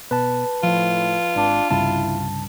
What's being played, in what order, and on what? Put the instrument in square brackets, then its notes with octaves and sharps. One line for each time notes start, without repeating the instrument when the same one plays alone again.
[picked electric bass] B2 [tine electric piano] B4 A5
[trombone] A2 [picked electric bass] F3 [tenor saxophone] F4
[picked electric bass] G#1 [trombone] D4
[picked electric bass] C2 G2 C#3 [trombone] E4 [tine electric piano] A5